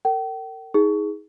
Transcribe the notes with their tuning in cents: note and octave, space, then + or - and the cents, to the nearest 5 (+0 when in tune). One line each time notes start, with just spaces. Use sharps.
A#4 -40 G5 -40
D#4 +35 G#4 +0